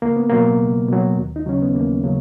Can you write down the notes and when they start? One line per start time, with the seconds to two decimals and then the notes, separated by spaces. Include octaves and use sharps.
0.02 C#2 A#3
0.16 B3
0.30 B2 F#3 A#3
0.60 C#2
0.89 B2 F#3
1.17 D#2
1.36 D#4
1.46 C#3 F#3 C#4
1.62 B3
1.75 D#2 A#3
2.04 C#3 F#3